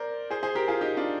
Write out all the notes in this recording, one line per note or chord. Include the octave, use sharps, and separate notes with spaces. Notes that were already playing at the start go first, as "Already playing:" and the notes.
Already playing: A#4 C5 D5
G#4 C5
G#4 C5
G4 A#4
F4 G#4
D#4 G4
D4 F4